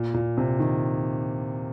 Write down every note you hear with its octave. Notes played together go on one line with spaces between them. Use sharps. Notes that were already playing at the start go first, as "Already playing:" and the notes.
Already playing: A#2
A#2
C3
D#3